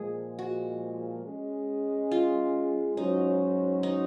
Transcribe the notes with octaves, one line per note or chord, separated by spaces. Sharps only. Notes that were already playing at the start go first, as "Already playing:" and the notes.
Already playing: A#2 F3 G#3 G#4
F#4
G#3 C#4 G#4 D#5
F4
G#2 F#3 C#4 D#4 F#4 C5
D#4